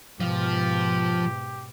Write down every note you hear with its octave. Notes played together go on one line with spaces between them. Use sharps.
G#2 B2 F3 G4